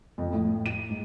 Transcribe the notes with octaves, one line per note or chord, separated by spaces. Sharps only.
F2
A2
D#7
G#2